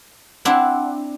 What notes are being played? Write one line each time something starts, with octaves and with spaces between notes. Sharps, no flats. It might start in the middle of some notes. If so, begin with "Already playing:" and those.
C4 D4 E4 F#5